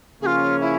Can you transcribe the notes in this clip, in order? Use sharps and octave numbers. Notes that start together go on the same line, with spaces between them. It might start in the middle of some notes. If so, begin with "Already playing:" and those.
C#3 F3 A#3 C#4 F4 G#4
E4